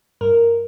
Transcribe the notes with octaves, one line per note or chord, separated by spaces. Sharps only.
G2 A#4